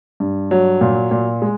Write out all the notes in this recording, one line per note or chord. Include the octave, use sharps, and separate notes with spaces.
G2
F#3
A#2
A#2
G#3